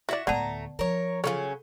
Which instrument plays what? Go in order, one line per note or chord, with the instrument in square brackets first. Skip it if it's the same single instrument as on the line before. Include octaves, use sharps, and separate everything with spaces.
[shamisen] E4 D5 [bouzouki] F#4 E5
[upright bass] D2 A2 [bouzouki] A3 A#5 [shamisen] B3 [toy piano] D5 F#5 A5
[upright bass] F3 [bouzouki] A#4 C#5
[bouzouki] C#3 F#3 C#4 [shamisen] F4 C#5 [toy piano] A4